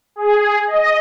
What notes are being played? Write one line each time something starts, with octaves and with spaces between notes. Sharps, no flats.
G#4
D#5